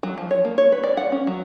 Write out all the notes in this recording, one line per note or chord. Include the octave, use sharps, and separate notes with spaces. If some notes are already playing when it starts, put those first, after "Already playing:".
F#3
F3
C#5
A#3
C#5
B4
D5
F#5
C#4
F#3